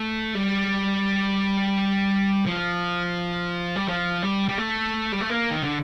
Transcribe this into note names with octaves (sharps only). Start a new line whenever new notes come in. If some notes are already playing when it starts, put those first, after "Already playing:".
Already playing: A3
G3
F3
G3
F3
G3
G3
A3
G3
A3
A#3
D#3
D3